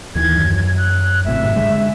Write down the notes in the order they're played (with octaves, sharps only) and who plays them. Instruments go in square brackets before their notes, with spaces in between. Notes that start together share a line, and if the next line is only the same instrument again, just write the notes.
[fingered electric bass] D#2 D#3 E3 [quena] G#6
[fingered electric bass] F#2
[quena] F#6
[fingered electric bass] G#1 A2 C3 [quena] E5
[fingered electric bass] D3 G#3